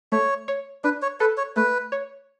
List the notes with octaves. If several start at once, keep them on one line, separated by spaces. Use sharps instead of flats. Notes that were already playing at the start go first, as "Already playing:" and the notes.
A3 C#5
C#5
D4 B4
C#5
A4 B4
C#5
A3 B4
C#5